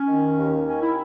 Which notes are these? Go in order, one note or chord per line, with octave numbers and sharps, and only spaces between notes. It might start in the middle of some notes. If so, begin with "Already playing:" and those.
Already playing: C#4
D#3
D#2
D#3 C#4
E4